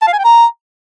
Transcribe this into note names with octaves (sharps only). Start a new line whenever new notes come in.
A5
F5
G#5
G5
A#5